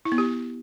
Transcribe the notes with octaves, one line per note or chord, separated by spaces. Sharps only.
E4
B3
G4